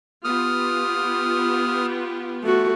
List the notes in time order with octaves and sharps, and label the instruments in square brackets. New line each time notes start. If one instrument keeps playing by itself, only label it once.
[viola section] B3 F4 G4 [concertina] D#6 F6
[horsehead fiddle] A3 F#4